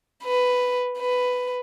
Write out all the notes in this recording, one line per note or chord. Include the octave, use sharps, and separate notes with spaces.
B4
B4